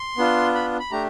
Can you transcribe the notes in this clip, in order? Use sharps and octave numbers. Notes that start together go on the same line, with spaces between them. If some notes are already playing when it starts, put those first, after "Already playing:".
Already playing: C6
B3 D4 F4
B5
B5
A3 D4 G4 A#5